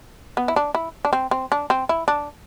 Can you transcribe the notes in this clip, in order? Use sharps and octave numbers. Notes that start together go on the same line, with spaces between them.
B3
E4
D4
E4
D4
C4
C4
D4
C4
E4
D4